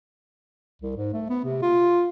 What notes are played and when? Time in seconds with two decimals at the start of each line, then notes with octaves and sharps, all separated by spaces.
0.82 C2
0.96 G#2
1.13 A3
1.30 B3
1.44 C3
1.62 F4